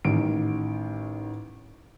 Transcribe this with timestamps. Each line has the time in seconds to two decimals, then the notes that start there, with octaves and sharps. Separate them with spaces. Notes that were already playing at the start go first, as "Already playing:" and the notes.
0.05 A1 D#3 D7